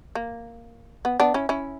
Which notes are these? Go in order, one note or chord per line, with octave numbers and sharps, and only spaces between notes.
A#3
B3
B3 D4
C#4 E4
C#4 E4